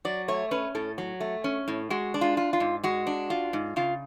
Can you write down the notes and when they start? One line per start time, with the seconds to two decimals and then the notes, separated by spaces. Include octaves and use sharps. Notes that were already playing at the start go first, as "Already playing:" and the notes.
0.05 F#3 D5
0.28 A3 C#5
0.51 C#4 B4
0.75 A2 A4
0.98 F#3
1.20 A3
1.44 C#4
1.68 A2
1.90 G#3 F#4
2.14 D4
2.21 F4
2.37 F4
2.53 F4
2.60 G#2
2.84 G#3 F#4
3.07 D4
3.30 F4
3.53 G#2
3.76 C#3 F4